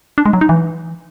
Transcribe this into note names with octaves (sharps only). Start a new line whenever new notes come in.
D4
G#3
F#3
D#4
E3